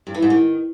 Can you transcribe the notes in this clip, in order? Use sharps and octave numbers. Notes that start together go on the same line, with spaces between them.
G2
E3
G#2
D#3